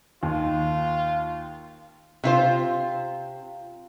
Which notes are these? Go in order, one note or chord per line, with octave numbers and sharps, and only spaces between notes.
D#2 F4
C3 F4 C5